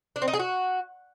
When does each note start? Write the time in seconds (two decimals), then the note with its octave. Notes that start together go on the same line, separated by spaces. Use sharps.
0.16 D4
0.22 C4
0.28 D#4
0.34 G#4
0.39 F#4